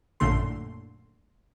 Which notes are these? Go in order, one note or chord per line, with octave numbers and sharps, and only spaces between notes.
A1 F#2 A#2 D3 A3 C6